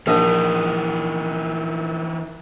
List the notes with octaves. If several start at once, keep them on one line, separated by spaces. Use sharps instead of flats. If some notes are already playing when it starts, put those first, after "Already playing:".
A#1 E3 D#4 D#5